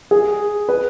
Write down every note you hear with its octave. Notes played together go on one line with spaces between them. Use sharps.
G#4
B4